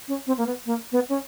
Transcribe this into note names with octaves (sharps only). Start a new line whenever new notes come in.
C#4
C4
A#3
B3
A#3
B3
C#4